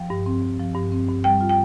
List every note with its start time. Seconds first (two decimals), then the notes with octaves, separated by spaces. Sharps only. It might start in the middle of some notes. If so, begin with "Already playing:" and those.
Already playing: F3 G5
0.10 G2
0.26 C4
0.42 G2
0.59 F3
0.75 G2
0.92 C4
1.08 G2
1.24 G3 G5
1.41 F4
1.49 G5